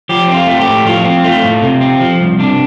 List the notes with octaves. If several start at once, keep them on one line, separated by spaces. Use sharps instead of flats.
F3 G4
C4
F4
A3
G4
A2
F3 F4
C4
A3 F4
A2
C3
C4
F3
C2
C3 D4